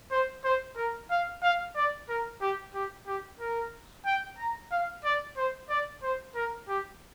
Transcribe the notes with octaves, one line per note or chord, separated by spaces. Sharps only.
C5
C5
A#4
F5
F5
D5
A#4
G4
G4
G4
A#4
G5
A#5
F5
D5
C5
D5
C5
A#4
G4